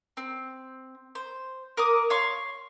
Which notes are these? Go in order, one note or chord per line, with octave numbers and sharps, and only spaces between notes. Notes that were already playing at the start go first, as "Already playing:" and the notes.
C4
C5
A#4 D6 D#6
C#5 F5 C6 C#6